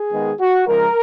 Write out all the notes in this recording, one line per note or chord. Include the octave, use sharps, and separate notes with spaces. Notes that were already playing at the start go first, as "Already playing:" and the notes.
Already playing: G#4
D#3 G#3 B3
F#4
C#3 F3 G#3 A#4